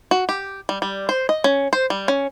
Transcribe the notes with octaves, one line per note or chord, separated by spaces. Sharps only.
F#4
G4
G3
G3
C5
D#5
C#4
C5
G3
C#4